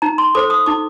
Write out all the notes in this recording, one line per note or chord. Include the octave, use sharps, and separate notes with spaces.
D#4 A#5
C6
A4 C5 D6
D#6
D#4 D6